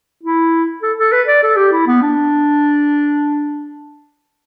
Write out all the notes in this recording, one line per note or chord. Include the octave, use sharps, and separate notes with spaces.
E4
A4
A4
B4
D5
A4
G4
E4
B3
D4